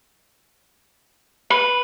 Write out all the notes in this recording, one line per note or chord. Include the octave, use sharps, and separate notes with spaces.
B4